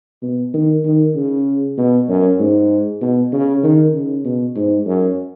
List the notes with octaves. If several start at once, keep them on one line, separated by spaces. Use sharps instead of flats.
B2
D#3
D#3
C#3
B2
F#2
G#2
B2
C#3
D#3
C#3
B2
G#2
F#2